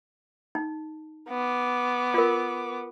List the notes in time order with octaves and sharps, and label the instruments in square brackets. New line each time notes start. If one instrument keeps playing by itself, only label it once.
[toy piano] D#4
[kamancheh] B3 D6
[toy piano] F4 A#4